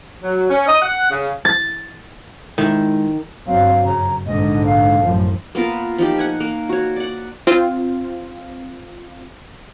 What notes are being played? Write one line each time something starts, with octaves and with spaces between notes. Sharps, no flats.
F#3
C#4
D#5
F#5
C#3
A6
D#3 G#3 E4 E5
G1 F#3 C4 F5
F#2 C#3 A#5
A#1 G#2 D3 D#5
F5
A1 F#2 F3
A#3 B3 F4 A#4
F3 D#4 G4
F#5 G#5
A#3
F#4 C#5
D5 F#5
C4 F4